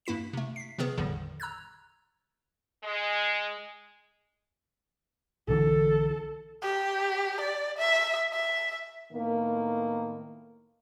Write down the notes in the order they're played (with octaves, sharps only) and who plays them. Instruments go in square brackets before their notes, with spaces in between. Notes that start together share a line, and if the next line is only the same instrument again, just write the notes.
[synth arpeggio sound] G2 A#3 E4 B6 E7
C3 A3
B6 C7
C3 D#3 B3 G#4 B4
G#1 E2 A2 D3 F3 G3
A#5 E6 F#6 G#6
[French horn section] G#3
[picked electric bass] B1 D3 E3 [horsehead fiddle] A4
[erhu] G4
D5
E5
E5
[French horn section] A2 D#3 A#3 B3 A#4